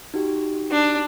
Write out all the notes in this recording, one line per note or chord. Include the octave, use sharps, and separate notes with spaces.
D#4 F#4 G4
D4